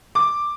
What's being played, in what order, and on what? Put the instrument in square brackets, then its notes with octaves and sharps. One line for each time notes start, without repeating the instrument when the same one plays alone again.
[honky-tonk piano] D6